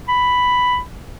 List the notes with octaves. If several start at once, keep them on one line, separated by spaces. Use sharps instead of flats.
B5